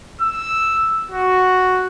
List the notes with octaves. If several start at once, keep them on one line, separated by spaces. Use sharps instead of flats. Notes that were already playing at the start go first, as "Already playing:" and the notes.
E6
F#4